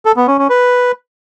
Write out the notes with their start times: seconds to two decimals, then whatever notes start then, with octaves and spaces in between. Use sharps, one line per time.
0.05 A4
0.16 B3
0.27 C#4
0.38 C#4
0.50 B4